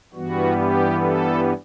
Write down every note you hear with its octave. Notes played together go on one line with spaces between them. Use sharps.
G2 E3 G3 B3 F#4
G4
A4